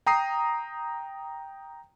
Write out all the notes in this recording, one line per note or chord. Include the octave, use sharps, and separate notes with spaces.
G5 A#5 D#6 C7